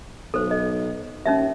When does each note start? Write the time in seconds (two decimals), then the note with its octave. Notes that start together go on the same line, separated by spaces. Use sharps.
0.34 B1 A4 C5
0.51 D#5
1.26 D#2 C#4 D#4 E5